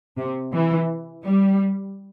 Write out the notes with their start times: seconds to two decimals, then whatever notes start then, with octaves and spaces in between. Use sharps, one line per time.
0.17 C3
0.53 E3
1.23 G3